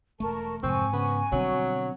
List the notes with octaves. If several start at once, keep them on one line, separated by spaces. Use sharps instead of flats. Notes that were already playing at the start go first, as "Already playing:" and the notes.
E1 F2 A3 A#4 A5 C#6
F2 G#2 C3 F3 C4 G#5 C#6
C#3 B3
B2 D3 F#3 G3 C4